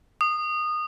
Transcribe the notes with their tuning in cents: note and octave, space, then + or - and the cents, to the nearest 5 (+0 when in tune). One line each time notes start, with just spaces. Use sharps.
D#6 -20